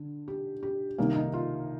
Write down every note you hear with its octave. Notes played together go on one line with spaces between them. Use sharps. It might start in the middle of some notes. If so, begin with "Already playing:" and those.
Already playing: D3
G4
G4
C2 C3 D#3 A#3
D#4
F4